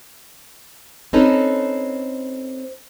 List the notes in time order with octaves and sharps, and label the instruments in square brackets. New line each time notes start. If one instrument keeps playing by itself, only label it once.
[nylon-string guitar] C4 C#4 D#4 A4 B4